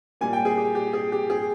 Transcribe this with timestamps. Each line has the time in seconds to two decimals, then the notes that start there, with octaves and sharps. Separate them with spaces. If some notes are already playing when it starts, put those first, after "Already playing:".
0.21 A#2 G3 A#3 G#5
0.33 G5
0.45 G#4
0.57 G4
0.75 G4
0.93 G#4
1.12 G4
1.30 G#4